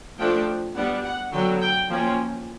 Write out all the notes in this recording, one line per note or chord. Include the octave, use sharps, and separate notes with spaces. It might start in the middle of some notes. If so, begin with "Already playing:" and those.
F3 A3 D4 G5
G3 B3 D4 F#5
F#5
D3 F#3 B3 G5
G5
F3 A#3 C#4 G5